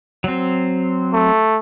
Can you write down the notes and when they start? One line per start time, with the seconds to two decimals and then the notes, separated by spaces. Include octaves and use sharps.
0.24 F#3 C4
1.13 A3